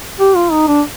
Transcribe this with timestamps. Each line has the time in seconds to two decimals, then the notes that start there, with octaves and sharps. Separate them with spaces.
0.20 G4
0.36 F4
0.52 D#4
0.67 D4